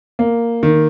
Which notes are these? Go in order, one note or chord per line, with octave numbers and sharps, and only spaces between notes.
A#3
D#3